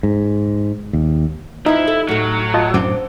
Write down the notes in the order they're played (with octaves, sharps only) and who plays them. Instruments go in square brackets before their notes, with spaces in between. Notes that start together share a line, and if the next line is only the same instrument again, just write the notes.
[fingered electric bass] G#2
D#2
[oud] E3 F3 [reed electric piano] D#4 [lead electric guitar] E4
[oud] A4
[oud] A2 A4 [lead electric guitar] F#3
[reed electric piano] F4 D#5 A5
[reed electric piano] F#2 A2 D6 [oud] C4 D4